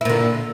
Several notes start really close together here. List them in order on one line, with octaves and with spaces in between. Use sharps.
E4 A#2 D3